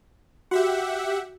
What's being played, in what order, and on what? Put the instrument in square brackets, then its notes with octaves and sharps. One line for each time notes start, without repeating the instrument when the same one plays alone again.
[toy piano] F#4 [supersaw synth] G4 E5 F#5